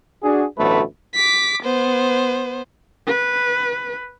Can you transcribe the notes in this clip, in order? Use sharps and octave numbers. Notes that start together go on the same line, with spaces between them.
D4 F#4 G#4
A1 D2 B2 F#3 A3 B4
D6 B6
B3 C5
B4